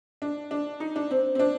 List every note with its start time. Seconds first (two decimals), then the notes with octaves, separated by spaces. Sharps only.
0.22 D4
0.51 D4
0.80 D#4
0.96 D4
1.11 C4
1.35 C4
1.39 D4